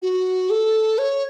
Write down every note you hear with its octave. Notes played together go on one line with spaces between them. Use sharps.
F#4
A4
C#5